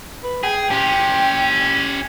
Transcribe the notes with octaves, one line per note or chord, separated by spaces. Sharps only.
B4
G#4 G5
C#4 G4